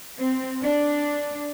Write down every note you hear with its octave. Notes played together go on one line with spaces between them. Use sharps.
C4
D4